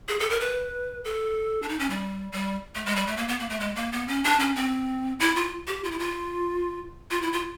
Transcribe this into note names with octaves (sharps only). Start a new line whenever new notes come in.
G#4
A4
A#4
B4
A4
D4
D#4
C#4
G3
G3
A3
G#3
G3
A3
A#3
B3
A#3
A3
G#3
A#3
B3
C#4
D4
C#4
C4
E4
F4
G4
F4
E4
F4
F4
E4
F4